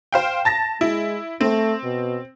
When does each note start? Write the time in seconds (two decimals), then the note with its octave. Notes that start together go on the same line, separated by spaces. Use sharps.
0.12 C5 F5 G5
0.45 A5 A6 A#6
0.81 G#3 E4
1.41 A3 C4
1.84 B2